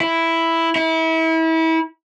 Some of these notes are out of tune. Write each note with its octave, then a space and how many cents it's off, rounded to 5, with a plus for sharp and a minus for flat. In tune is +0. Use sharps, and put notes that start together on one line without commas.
E4 +0
E4 -30